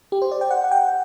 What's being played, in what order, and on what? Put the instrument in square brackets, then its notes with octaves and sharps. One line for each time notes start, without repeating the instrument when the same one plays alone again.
[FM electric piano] G4
C5
D5
G5
F#5
F#5
G5
F#5